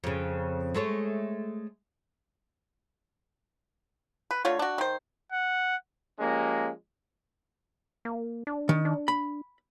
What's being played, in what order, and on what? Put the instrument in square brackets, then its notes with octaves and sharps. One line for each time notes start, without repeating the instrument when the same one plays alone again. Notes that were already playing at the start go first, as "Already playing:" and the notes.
[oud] F2 C#3
G#3 A3 C#5
[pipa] B4
D3 A3 F4 C#5
D4 F#4
D#3 C5
[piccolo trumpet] F#5
[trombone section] F3 G#3 A#3 C#4 G4
[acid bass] A#3
D4
[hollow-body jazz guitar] D#3
[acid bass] D4
[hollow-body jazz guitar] B5